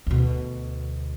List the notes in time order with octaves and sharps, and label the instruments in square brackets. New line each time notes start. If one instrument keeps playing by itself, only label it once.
[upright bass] D2 B2